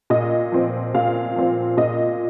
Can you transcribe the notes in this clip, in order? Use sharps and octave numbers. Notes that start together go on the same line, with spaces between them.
A#2 D#5
F3 C4
A#2 F5
F3 C4
A#2 D#5